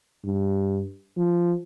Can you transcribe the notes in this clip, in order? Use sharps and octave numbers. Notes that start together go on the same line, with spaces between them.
G2
F3